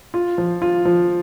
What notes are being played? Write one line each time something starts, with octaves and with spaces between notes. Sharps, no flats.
F4
F3
F4
F3